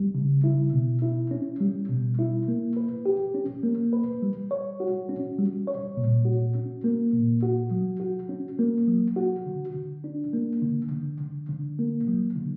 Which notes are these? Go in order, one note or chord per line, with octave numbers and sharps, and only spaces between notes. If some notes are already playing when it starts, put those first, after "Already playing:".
Already playing: G3
C#3
E4
B2
E4
C#4
G3
B2
E4
A#3
B4
G4
C#4
A#3
B4
G3
C#5
F#4
C#4
G3
C#5
A#2
F#4
C#4
A#3
A#2
F#4
F#3
F#4
C#4
A#3
F#3
F#4
D3
D3
D4
A#3
D3
D3
D3
D3
A#3
F#3
D3